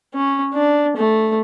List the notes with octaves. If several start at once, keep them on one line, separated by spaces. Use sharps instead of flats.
C#4
D4
A3